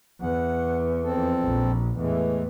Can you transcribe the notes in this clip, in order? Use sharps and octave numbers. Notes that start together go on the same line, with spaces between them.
E2 F#5
F2 C4 A4
A#1
E2 A2 E3 G#3 A3